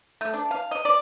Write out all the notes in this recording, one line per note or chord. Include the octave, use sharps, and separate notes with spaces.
A3
D4
F5
D#5
D5